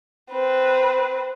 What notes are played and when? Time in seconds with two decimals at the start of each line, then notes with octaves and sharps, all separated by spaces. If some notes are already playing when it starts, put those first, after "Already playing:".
0.32 C4 B4